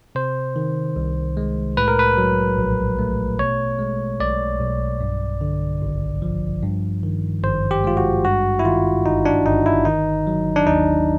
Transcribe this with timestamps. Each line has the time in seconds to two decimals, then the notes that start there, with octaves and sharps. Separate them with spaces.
0.15 C3 C5
0.56 D#3
0.96 C2
1.37 G#3
1.77 A2 B4
1.88 A#4
1.99 B4
2.17 F#3
2.58 A#1
2.99 A3
3.39 B2 C#5
3.79 G#3
4.20 B1 D5
4.61 B1
5.01 G2
5.41 D3
5.82 G#1
6.22 F3
6.63 G2
7.03 D#3
7.43 G#1 C5
7.71 G4
7.84 G#3 F4
7.97 F#4
8.25 G2 F#4
8.59 E4
8.65 D#3 F4
9.06 G1 D#4
9.25 D4
9.46 G1 D#4
9.66 E4
9.85 D#3 D#4
10.27 F#3
10.56 D4
10.66 D#2 D#4